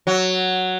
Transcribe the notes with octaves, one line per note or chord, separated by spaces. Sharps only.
F#3